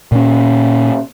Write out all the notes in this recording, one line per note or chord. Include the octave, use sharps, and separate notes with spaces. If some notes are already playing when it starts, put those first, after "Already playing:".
A#2 C#4